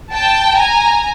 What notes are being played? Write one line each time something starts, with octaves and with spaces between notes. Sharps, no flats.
G5 A5
G#5 A#5